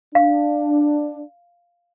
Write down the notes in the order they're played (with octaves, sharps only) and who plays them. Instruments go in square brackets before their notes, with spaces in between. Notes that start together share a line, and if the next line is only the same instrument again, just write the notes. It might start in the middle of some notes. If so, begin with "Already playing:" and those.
[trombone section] D4 [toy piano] F5